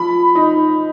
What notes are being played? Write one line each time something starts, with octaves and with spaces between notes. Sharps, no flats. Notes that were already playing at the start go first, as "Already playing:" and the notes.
Already playing: F3 B5
D#4